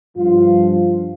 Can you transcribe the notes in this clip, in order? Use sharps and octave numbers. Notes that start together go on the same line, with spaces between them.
G2 F3 F4